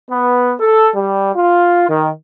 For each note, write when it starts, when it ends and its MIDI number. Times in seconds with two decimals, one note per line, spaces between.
0.11 0.55 59
0.61 0.90 69
0.96 1.31 55
1.36 1.90 65
1.90 2.10 51